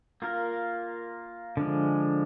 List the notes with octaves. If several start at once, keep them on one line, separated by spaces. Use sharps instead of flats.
A#3 F4 A#4
D3 F3 G#3